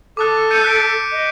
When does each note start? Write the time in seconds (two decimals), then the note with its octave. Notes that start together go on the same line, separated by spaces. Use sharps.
0.17 A4 D6 D#6 F#6
0.51 G6 C#7 D#7
0.64 F#6 B6 D7
1.12 D#5